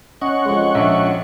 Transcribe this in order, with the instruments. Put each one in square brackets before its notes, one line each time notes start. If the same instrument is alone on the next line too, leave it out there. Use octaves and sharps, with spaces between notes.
[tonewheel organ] C#4 F#5 C#6 [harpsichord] D#5
[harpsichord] F2 G#3
[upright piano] A#1 E5